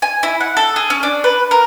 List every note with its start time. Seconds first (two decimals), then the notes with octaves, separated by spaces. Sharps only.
0.02 G#5
0.23 E4
0.41 F#5
0.57 A4
0.76 G#4
0.90 C#4
1.03 D4
1.24 B4
1.51 A#4